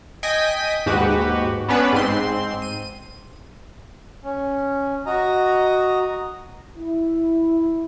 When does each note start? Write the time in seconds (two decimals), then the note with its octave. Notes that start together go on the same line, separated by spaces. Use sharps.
0.23 D#5 G5 G#5 B6 D#7
0.86 D#2 G#2 F#4 G4 B4
1.68 B3 C#4 D4 B4
1.93 G#2 C4 C6
2.62 D#7
4.24 C#4
5.06 F#4 D#5 A#5
6.77 E4